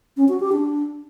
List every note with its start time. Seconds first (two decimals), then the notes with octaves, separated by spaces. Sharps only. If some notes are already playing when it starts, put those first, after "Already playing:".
0.17 C#4
0.28 F#4
0.40 G4
0.52 D4